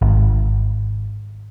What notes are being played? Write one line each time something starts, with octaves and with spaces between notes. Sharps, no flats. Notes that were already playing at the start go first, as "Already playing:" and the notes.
G#1